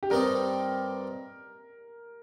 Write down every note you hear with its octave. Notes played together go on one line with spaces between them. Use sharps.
G4
G2 G3 C4 D#4 A#4